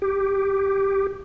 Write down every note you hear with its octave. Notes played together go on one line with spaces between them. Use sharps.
G4